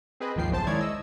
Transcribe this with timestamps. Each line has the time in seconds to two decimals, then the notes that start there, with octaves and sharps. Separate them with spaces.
0.20 C4 G#4 B4 D#5
0.36 G#1 D#2 F3 G5 C7
0.50 B1 F#2 C#3 C5 A5
0.67 D#3 G#3 E4 C#5 D5 G#6
0.81 D#5 E6